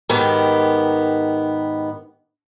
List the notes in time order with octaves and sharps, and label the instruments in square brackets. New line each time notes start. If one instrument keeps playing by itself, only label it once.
[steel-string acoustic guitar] G#2 D#3 B3 G4